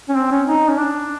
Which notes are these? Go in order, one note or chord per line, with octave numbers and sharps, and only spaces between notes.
C#4
C4
C#4
D#4
C#4
D4